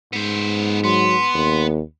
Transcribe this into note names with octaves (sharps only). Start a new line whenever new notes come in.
G#2 B3 C5
F#3 B3 C6
D#2